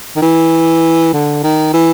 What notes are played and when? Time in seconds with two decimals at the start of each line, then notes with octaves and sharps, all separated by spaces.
0.16 D#3
0.22 E3
1.13 D3
1.43 D#3
1.74 E3